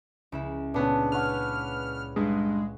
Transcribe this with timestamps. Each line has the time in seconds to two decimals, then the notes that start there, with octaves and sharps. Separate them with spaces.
0.32 C#2 E4 E5
0.74 A#2 C#3 B3 C#4 D4
1.12 B4 C#5 F#5 F6
2.16 G2 G#3